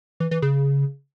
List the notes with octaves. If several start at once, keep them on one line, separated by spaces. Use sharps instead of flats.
E3
E3
C#3